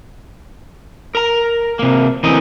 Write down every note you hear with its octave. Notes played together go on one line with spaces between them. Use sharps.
A#4 A#5
C3 A#3
D2 E3 C4 C#4 A#4 D#5